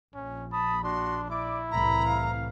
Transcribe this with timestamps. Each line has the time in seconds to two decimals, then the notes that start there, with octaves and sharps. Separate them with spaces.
0.15 A#1 C#4
0.52 A5 B5 D#6
0.84 D4 F#4 C6
1.30 E4 D5 D6
1.71 C2 A2 E3 A#5 B5
2.06 F5